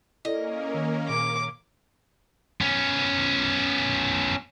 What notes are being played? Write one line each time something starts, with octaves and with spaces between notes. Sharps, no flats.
A#3 C#4 E4 A4 A#4 D5 D#5
D#3
A#2 D6
B3 C#4